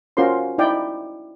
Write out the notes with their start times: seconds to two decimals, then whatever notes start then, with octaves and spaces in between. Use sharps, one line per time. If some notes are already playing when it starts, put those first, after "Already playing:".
0.17 C#4 F4 F#4 A#4 C5 C6
0.58 D#4 E4 D5 G5